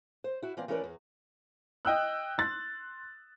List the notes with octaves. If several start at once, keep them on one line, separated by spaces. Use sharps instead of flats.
C5
E4 F#4
E3 A#3 C4 D5
E3 A3 C#4 A#4 B4 D5
E2
D#5 G5 E6 F#6
C6 F#6 A6